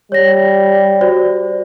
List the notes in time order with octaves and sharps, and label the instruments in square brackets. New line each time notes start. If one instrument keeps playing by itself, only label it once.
[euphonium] G3 [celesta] C#5 A#6
[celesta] F#4 C5 D5